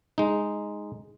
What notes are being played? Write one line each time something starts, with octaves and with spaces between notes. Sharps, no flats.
G#3 D#4